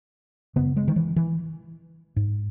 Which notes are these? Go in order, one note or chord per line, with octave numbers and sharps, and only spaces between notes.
F#2 C#3 B3
G#3
D#3
E3
E3
G#2